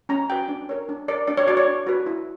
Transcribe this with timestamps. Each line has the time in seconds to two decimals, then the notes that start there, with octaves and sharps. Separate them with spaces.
0.09 C#4 A#5
0.30 F#4 B4 G5
0.48 D4
0.69 A#4 C#5
0.89 D4
1.08 A#4 C#5 D5
1.28 D4 D5
1.37 C#5
1.47 F#4 B4 D5
1.57 C#5
1.67 D4
1.87 F#4 B4
2.06 E4